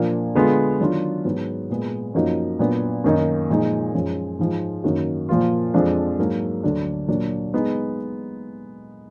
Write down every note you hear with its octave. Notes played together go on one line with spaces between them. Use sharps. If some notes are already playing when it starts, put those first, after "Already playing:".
Already playing: A#2 F3 A#3 D4
D3 G#3 B3 F4
D#3 F#3 D4 F4
G#2 F#3 B3
A#2 G#3 B3
F#2 F3 A#3 D#4 F#4
A#2 F#3 B3 D4
F#2 D#3 A#3 D#4
A#2 F3 G#3 D#4
F#2 F3 G#3
G#2 F3 G#3
F#2 D#3 A#3 D#4 F#4
A#2 F3 A#3 F4
F2 F3 G#3 D4
G#2 F#3 A#3
D2 D3 F#3 D4
A#2 F#3 A#3 D4
G#3 B3 D#4